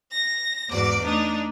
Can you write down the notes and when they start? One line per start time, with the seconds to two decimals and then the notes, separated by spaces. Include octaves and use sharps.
0.11 A#6
0.70 E2 G#2 F#4 D5 D6
1.01 A3 D4 D#4